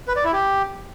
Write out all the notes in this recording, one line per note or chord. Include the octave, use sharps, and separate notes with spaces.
B4
D5
E4
G4